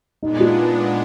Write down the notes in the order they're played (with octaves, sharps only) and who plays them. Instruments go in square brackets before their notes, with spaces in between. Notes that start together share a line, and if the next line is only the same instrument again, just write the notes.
[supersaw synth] A#2 G#3 B3 D4 [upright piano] D#4
[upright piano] F4